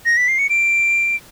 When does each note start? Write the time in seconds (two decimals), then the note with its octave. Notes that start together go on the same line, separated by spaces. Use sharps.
0.06 A#6
0.17 B6
0.28 C7
0.39 C#7
0.50 D7